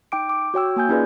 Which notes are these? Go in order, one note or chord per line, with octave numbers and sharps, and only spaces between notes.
D#4 G5 D6 D7
D6
F#4 C#5 G5 E6
A#3 G#5 G6
C#4 D#4 F4 G#4 B4 D5